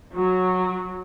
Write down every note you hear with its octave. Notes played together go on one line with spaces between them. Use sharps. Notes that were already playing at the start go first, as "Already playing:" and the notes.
F#3